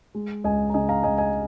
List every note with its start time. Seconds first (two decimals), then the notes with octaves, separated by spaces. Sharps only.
0.15 G#3
0.44 C#2 D#5 G#5
0.70 A#5
0.74 C#3 D#5 G#5
0.89 F5 A#5
1.03 C#2 D#5 G#5
1.18 D#5 G#5